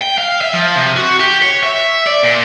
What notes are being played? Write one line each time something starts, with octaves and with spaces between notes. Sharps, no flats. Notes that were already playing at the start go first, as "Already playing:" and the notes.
G5
F5
E5
F3
C3
F#4
G4
C#5
E5
D5
A#2